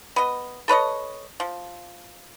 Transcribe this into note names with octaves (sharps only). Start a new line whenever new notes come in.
B3 D#5
A4 B4 C#5 D#5
F3